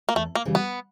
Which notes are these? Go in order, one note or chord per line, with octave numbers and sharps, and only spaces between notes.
A#3
E2 A3
A#3
C#3 E3 G3
B3